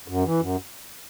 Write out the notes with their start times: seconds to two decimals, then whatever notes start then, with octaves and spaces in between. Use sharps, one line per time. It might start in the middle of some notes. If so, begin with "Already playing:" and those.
0.08 F#2
0.25 E3
0.41 F#2